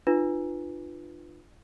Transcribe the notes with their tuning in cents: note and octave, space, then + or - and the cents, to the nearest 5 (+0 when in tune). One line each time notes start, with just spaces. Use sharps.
D4 +45 F4 +0 B4 +0